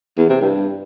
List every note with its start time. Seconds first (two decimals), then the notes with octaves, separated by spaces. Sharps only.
0.18 E2
0.30 C3
0.41 G2